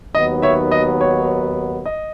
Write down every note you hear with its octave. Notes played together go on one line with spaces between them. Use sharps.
D#2 D#3 F#3 B3 D#5
C#5 E5
D#5
C#5
D#5